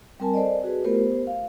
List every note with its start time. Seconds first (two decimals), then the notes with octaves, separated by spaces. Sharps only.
0.20 G3 C4 A#4 G#5 A5
0.34 A4 C5 D5 D#5
0.63 F#4 G#4 B4
0.84 A3 B3 F4 G4 A#4 C5
0.96 B3 C5
1.27 F5